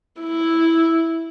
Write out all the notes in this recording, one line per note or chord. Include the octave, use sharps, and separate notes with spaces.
E4